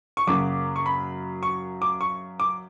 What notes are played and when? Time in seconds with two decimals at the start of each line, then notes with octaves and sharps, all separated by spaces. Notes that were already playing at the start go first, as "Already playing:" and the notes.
0.17 C#6
0.27 F#2 C#3 F#3 A#3 D6
0.76 C#6
0.86 B5
1.43 C#6
1.82 D6
2.01 C#6
2.40 D6